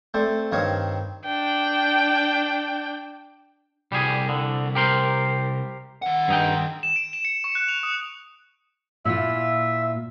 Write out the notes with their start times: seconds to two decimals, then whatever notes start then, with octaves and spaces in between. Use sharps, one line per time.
0.14 A3 C4 C5 D5
0.52 G2 D#3 C4 C#5 F5 D#6
1.25 D4 G5
3.92 C2 G3 G4 G#4
4.29 D3
4.75 G4 A#4 C5
6.02 D#3 F#5
6.28 G2 D#4 G5
6.83 E7
6.96 D7
7.13 E7
7.25 C#7
7.44 C#6
7.55 F#6
7.68 F7
7.83 D#6
9.05 A#2 E4 F4 E5